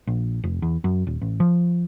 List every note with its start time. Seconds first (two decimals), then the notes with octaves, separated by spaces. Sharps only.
0.07 A#1
0.44 F1
0.62 E2
0.84 F#2
1.07 D#1
1.22 A1
1.40 F3